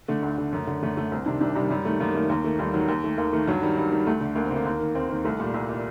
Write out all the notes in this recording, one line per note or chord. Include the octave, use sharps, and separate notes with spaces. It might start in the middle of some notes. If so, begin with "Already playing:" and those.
D3 A3
D2
D3
F#2
D3
F#2 A3
D3 A3
C2 C4
C3 D#3 D4
C2 D4
C3 D#3 G3
F#2 G3
D#3 A3
F#2 A#3
D#3 A3
D#2 A#3
D#3 A3
D#2 G3
D#3 F#3
D#2
D#3 A3
D#2 A#3
D#3 A3
G2 F#3
D#3 G3
G2 G3
D#3 G3
D2 A3
D3
D2 A#3
C4
D3
A#3
D#2
D#3
D#2 C4
D#3 A#3
C2 A3
A#2 G3
C2
A#2